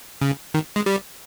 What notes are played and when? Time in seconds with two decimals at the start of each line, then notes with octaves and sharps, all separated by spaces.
0.22 C#3
0.54 D#3
0.76 G#3
0.86 G3